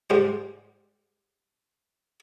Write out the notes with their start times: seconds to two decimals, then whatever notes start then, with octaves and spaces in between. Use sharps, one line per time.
0.10 G#2 G3 C5